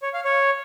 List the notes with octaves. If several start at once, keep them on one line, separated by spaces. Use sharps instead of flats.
C#5
F5
C#5